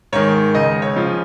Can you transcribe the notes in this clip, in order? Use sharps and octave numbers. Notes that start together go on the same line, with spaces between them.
G#2 D#3 C#5
C#2 D#5
C#5
C#3 F3